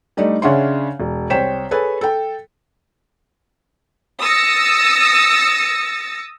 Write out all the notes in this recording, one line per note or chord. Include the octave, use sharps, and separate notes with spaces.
G3 A3 D4 D#4 D5
C#3 C#4 D4 E5 F#5 C6
E1
C2 C5 C#5 G5 B6 E7
G#4 A4 B4 C#5 G#5
A4 G5
D#6 E6 A6 A#6 C#7